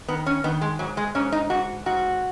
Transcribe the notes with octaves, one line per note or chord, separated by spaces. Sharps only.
D#3 B3
C#4
D#3 B3
G#3
G#2 F#3
G#3
G#2 C#4
D#4
G#2 F#4
G#2 F#4